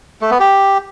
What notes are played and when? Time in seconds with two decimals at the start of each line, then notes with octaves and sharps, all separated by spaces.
0.21 A3
0.31 B3
0.40 G4